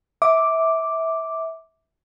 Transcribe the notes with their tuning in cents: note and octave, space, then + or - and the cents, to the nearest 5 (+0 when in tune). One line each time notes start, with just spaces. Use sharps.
E5 -20 D6 +0